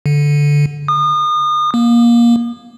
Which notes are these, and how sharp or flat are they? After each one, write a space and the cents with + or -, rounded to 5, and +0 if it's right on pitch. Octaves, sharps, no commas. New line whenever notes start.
D3 -10
D#6 -35
A#3 +20